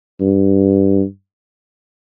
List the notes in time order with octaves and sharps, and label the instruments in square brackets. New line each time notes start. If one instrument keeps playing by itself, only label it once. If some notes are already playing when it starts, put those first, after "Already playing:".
[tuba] G2